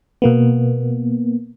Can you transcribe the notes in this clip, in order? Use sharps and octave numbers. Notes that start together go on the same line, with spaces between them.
B2 A#3 B3